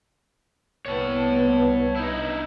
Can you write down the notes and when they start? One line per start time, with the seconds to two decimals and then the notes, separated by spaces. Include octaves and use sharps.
0.86 C2 B3 C#5 A5
1.96 D#4 E4